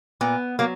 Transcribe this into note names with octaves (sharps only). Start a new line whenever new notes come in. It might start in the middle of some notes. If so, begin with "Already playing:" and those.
A#2 B3
F#3 A#3